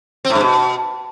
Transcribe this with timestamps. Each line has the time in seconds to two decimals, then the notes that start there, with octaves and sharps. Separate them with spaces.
0.25 C4
0.30 A2
0.35 G2
0.41 B2